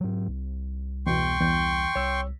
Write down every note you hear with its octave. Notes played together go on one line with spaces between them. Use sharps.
G#2 F#3
C2
E2 B2 G5 C6 C#6
E2 G6
C2 C#5 E6